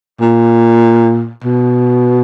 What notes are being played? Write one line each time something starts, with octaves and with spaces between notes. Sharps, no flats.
A#2
B2